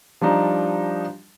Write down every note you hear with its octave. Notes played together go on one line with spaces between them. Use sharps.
F3 G3 D4 D#4